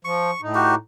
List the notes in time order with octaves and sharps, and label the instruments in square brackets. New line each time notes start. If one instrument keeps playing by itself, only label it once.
[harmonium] F3 [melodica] C#6
[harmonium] A2 D#4
[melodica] F#4 G4